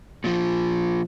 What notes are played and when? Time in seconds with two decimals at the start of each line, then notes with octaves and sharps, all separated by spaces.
0.24 A#2 F3